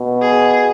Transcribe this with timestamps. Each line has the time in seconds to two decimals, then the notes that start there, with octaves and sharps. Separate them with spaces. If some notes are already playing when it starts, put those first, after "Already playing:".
Already playing: B2
0.22 G#4